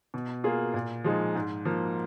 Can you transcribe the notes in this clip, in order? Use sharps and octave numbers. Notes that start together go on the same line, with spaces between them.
B2
A#3 F4 G#4
A#2
F3 G#3 D#4
G#2
F3 A#3